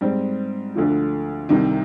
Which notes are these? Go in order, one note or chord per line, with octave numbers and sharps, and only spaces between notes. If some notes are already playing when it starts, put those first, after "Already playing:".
G#2 G3 C4
D2 D3 F3
C2 C3 D#3